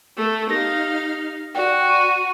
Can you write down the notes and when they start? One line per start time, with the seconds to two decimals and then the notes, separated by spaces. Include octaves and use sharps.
0.17 A3
0.50 D#4 G4 F5 A#6
1.55 F#4 D5 G5
1.89 C#6 D#7